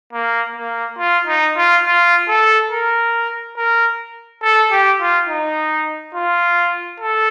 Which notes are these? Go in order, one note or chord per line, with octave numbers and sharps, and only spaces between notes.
A#3
A#3
F4
D#4
F4
F4
A4
A#4
A#4
A4
G4
F4
D#4
F4
A4